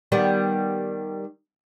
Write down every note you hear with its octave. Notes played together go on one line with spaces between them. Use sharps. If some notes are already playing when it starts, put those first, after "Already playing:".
D#3 G3 B3